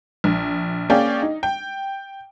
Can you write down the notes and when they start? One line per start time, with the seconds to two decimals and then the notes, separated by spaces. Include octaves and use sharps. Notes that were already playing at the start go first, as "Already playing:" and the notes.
0.24 A#1
0.90 A#3 C#4 G#4 D5 G5
1.22 D#4
1.43 G5